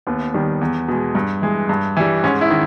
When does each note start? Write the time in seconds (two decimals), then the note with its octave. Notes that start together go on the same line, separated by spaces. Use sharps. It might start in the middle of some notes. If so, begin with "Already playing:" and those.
0.07 D#2 B3
0.34 D#3 G3
0.61 E2
0.88 B2 G#3
1.15 G2
1.42 E3 G#3
1.69 G2
1.97 E3 G3
2.23 G#2 C#4
2.41 E4
2.50 D#3